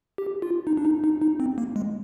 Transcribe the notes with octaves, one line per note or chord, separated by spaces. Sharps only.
G4
F4
D#4
D4
D#4
D#4
D#4
C4
A#3
G#3